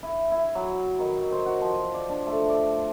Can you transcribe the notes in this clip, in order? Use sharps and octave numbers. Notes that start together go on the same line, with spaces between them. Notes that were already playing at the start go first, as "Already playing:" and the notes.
E4
E4
F#3
D#3
C5
F#4
F3
D5
D4
A3
D5